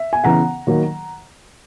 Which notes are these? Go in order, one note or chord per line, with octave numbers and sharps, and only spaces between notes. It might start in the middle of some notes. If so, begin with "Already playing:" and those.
Already playing: E5
G#5
C#3 E3 B3 F#5 A#5
D#3 F#3 A#3